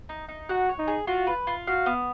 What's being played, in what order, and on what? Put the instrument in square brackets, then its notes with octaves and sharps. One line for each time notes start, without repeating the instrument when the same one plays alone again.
[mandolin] D#4
D#4
[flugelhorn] F#4 [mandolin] F#5
[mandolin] C#5
[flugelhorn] D#4
[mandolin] G#4
[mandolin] F4 [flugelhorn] F#4
[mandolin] B4
F4
[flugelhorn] F#4 [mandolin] F5
[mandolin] B3